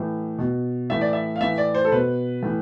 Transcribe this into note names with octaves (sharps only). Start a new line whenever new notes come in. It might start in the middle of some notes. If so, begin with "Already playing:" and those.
Already playing: A2 E3
B2
A2 E3 E5
D5
E5
F5
A2 E3 E5
D5
C5
A4
B2 B4
A2 E3